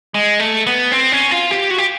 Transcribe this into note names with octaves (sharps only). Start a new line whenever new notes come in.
G#3
A3
B3
C4
C#4
F4
G4
F#4
G4